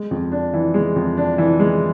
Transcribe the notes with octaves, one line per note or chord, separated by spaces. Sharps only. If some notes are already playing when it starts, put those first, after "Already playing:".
Already playing: G#3
F2
D4
E3
G#3
F2
D4
E3
G#3